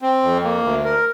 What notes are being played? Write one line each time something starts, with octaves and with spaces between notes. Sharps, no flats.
C4
F2
A#3
D2
A#4